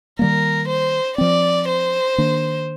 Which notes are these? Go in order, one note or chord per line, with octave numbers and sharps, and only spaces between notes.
D#3 G3 A#3 A#4
C5
F3 C4 D5
C5
D#3 A#3 D4